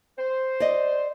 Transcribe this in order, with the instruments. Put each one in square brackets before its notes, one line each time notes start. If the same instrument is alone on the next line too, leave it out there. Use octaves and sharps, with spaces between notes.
[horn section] C5
[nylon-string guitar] D5 D#5